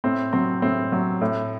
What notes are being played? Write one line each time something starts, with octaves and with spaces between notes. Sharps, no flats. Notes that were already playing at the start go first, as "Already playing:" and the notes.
A2 C4
F#3 C4
A2 C4
F#3
A2